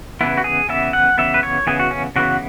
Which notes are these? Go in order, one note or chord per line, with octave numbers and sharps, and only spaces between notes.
C#3 E3 B3 E4
F#4
G#4
C#3 E3 B3 E5
F#5
C#3 E3 B3 E5
B4
C#5
C#3 E3 B3 G#4
F#4
C#4
C#3 E3 B3 F#4